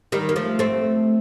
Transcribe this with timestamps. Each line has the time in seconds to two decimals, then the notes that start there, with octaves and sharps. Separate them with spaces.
0.12 D#3 G3
0.29 A#3
0.36 F3 A3
0.59 A3 C4